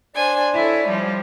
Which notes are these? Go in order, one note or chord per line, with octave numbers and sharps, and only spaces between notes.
D4 C5 D5 G#5
E4 A4 C#5
F3 G3